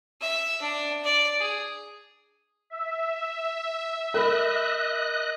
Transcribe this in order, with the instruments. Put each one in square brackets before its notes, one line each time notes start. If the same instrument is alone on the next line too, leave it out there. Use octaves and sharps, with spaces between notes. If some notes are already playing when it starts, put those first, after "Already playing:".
[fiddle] E5
D4
D5
G#4
[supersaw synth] E5
[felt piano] A#4 B5 [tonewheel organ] D#5 F#6